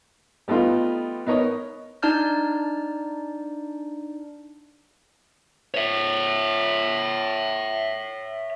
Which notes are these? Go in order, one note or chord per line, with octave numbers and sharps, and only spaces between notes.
G3 A3 B3 D#4 F4
B3 D#4 A#4 C#5 D#5
D4 D#4 D5 A5 F6 G6
C#5 E5